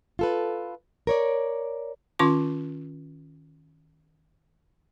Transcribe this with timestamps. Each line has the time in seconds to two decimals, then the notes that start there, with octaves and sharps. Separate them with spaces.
0.19 F4 A4 B4
1.07 A#4 C#5 D5
2.19 D#3 C#4 F4 C6 C#6